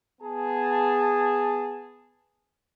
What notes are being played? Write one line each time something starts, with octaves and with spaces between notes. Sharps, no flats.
B3 G#4 A5